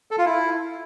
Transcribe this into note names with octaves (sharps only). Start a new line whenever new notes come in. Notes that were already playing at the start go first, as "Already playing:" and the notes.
A4
F4
E4